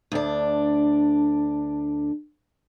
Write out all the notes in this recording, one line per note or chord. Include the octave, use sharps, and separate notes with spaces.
D2 D4